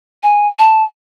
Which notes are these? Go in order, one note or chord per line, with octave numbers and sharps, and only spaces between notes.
G#5
A5